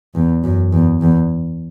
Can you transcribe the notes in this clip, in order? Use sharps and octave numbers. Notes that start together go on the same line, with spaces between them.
E2
F#2
E2
E2